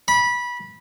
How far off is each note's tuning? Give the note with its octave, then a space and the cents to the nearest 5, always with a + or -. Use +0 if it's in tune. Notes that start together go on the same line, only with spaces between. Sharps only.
B5 -20